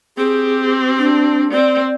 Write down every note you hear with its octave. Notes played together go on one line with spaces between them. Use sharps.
C4 G4 G#4
D4
C4 D5